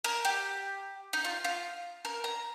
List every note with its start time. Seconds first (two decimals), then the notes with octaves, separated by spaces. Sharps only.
0.04 A#4
0.25 G4
1.13 D#4
1.25 F4
1.44 F4
2.05 A#4
2.24 A#5